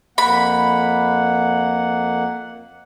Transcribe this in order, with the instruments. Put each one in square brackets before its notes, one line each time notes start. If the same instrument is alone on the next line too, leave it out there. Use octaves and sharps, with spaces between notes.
[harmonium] F2 A#3 F#5 [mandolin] B5